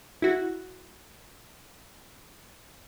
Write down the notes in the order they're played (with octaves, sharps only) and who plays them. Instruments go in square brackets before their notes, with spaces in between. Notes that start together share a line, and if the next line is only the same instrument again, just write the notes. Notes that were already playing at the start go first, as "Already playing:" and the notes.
[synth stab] E4 F#4